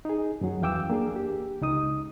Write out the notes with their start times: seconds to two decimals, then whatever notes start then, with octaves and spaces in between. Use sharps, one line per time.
0.05 D#4 G#4
0.41 F#2 F#3
0.61 E2 E3 F5 G5 D6 E6
0.90 A#3 D4 G#4
1.16 G4
1.61 C#2 D#4 D#6